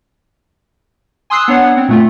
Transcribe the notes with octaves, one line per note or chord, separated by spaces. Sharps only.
G#5 C6 D#6 E6 F#6 C7
B3 D4 C#5 F#5
C4
A#2 A3 F4